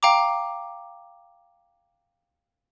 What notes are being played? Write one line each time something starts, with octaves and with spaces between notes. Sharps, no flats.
F5 G5 A#5 D6